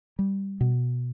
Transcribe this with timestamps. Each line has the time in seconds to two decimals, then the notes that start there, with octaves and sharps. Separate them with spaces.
0.19 G3
0.61 B2